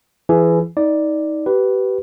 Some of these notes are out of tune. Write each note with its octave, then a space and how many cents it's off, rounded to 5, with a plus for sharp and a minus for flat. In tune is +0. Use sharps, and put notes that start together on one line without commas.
E3 +25 G#4 +20
D#4 +25 D5 +0
G4 -25 B4 +0